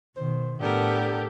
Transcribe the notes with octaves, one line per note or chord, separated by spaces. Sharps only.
B2 D#3 C5
A2 B3 D4 G4 A4 A#4